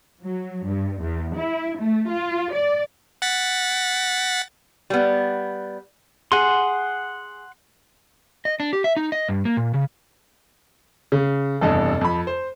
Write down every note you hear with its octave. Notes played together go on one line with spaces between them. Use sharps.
F#3
G2
E2
E4
A3
F4
D5
F#5 A6 B6
G3 B3
G#4 F#5 C6
D#5
D4
G4
E5
D#4
D#5
G2
A#3
A#2
C#3
C#3
F1 E2 G2 A4 D#5
F2 B5
C5